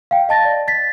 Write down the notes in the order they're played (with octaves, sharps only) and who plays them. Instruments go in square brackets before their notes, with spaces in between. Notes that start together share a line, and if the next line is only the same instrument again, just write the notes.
[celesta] F5 G5
D#5 A5 A6 A#6
D5
A6 B6